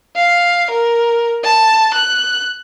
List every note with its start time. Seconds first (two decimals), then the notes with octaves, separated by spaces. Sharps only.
0.16 F5
0.71 A#4
1.44 A5
1.94 F#6